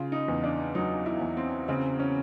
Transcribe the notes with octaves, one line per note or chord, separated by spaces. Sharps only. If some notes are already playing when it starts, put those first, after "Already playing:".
Already playing: C#3 F4
D#4
E2
D4
F#3 D#4
E4
E2
C4
C#3 C4
C#4